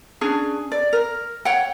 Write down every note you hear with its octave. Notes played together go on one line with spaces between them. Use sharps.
C#4 D4 G#4
D5
A#4
C#5 F#5 G5